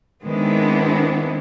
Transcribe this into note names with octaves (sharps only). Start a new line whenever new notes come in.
D#3 G#3 B3 C4 D4 E4